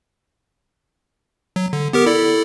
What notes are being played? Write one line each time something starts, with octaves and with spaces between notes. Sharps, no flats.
F#3
D3
B3 G4 A#4
E4 A4 D5